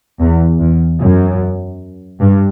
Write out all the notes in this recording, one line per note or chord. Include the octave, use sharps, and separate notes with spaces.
E2
E2
F#2
G2